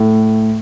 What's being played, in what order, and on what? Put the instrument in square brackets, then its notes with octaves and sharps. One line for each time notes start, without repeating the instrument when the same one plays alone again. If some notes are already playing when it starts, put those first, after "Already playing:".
Already playing: [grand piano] A2